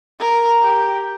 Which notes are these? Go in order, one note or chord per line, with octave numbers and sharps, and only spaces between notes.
A#4
G4